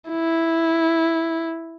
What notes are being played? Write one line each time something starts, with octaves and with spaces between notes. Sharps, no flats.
E4